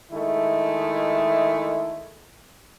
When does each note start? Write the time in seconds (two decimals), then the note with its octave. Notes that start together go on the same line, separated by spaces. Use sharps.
0.12 D#3 G#3 A3 E4